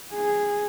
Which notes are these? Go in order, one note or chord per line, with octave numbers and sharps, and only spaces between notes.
G#4